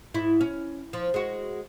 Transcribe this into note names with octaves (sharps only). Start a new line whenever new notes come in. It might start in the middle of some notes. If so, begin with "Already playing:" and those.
G#2 E4
C#4
F3
G#3 F#4